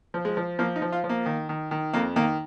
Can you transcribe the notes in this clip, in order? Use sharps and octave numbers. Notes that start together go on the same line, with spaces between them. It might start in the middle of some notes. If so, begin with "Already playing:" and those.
F3
G#3
F3
F3 A#3
D#4
F3
F4
F3
A#3
D#3
D#3
D#3
F2 A#3
D#3 A#3